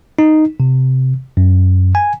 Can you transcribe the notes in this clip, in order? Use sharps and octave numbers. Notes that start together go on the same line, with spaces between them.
D#4
C3
F#2
G#5